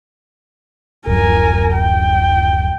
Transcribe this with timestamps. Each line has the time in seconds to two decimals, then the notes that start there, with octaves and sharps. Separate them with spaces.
1.07 D1 F#2 A#4 G#5
1.73 G5